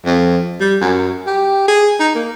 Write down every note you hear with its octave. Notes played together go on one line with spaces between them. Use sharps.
F2
G3
F#2
G4
G#4
D#4
A#3